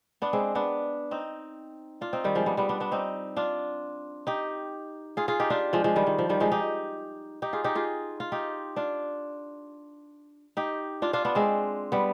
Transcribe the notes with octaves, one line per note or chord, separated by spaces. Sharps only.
B3 D4
G#3 C4
B3 D4
C4 D#4
D4 F4
C4 D#4
D#3 G3
F3 G#3
G3 B3
G3 B3
B3 D4
B3 D4
C4 D#4
D4 F4
D#4 G4
F4 G#4
F4 G#4
D#4 G4
D4 F4
F3 G#3
F3 G#3
D#3 G3
D#3
F3
D#3 G3
F3 G#3
D#4 G4
D#4 G4
F4 G#4
D#4 G4
F4 G#4
F4
D#4 G4
D4 F4
D#4 G4
D4 F4
D4 F4
B3 D4
G#3 C4
G3 B3